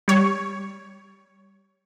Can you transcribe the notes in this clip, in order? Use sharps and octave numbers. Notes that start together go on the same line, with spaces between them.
G3 C#5